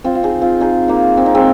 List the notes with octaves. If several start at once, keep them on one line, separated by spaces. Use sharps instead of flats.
C4 F4
F4
D#4 G#4
C4 F4
D#4 G#4
A#3 D#4
C4
D#4
G#3 C4